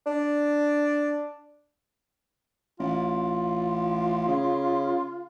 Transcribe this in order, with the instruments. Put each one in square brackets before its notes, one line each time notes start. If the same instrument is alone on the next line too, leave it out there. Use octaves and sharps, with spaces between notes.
[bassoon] D4
[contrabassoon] A1 [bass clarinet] F4
[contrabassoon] C#3